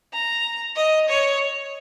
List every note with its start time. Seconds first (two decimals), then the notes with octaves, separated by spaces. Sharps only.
0.13 A#5
0.76 D#5
1.09 C#5